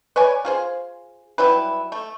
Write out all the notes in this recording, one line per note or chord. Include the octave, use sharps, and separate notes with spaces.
B4 C#5 D5 G#5
F4 G#4 C5
F#3 G3 E4 B4
A3